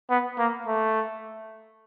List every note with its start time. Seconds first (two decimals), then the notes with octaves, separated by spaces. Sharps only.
0.10 B3
0.38 A#3
0.67 A3